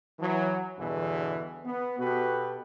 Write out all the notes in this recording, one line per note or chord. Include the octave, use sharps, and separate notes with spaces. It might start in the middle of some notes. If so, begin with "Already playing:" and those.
E3 F#3
E2 G2 B2 D3 E3
B3
B2 F#4 G4 A4 B4